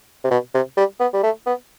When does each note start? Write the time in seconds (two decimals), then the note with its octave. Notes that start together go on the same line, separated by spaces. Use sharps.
0.25 C3
0.31 B2
0.55 C3
0.77 G3
1.00 B3
1.14 G3
1.23 A3
1.47 B3